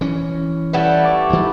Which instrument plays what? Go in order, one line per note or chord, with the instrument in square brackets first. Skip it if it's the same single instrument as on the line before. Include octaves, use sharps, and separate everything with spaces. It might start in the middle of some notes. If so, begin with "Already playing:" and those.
[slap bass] E3 C#4
[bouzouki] G3 A3 E4 [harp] B4 F#5
[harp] D5 C#6 D6
[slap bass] D2 D#3